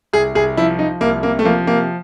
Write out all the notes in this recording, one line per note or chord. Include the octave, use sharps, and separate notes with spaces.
C2 G#4
C2 G#4
F3 E4
F3 D#4
C2 A#3
C3 A#3
A3
F3 A#3
C3 A#3